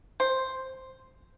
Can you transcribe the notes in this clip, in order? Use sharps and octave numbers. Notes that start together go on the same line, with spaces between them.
C5